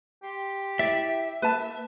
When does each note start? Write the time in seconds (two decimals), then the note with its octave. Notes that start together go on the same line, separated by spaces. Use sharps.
0.23 G4 C6
0.79 E4 D5 E5
1.42 A#3 B4 A5